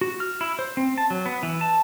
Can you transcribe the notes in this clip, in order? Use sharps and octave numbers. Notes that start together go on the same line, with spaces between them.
F#4
F6
E4
C5
C4
A5
F#3
B3
E3
A5